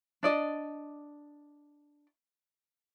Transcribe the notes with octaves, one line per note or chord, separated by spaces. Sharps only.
D4 D5 D#5